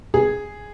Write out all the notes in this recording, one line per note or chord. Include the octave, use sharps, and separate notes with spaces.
G#4